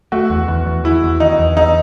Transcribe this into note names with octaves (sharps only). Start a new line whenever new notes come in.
A3 F#4
E2
E2
E2
E2 E4
E2
D#3 D#4
E2
E2 D#4